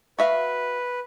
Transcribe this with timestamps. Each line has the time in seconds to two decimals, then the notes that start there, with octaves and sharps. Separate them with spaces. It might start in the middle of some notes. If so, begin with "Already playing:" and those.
0.19 F#4 B4 E5 F5